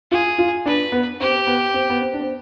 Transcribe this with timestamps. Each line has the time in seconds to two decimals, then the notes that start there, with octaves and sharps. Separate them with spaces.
0.11 F4 G#4
0.38 F4
0.66 D4 B4
0.92 B3
1.20 C4 G4
1.47 B3
1.74 C4
1.90 B3
2.01 C4
2.13 D4
2.20 C4